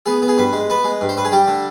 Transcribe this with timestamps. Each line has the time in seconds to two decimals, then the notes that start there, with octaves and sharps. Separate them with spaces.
0.06 B3 G#4
0.22 B3
0.28 G#4
0.38 G2 B4
0.53 G#3
0.70 B3 B4
0.84 G#3
1.01 G2
1.09 C5
1.17 G2 B4
1.25 G#4
1.32 G3 G4
1.48 D3